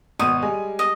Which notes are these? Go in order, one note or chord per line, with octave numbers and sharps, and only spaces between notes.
G#1 B2 D#6 D#7
G3 G#3 G#5
D#5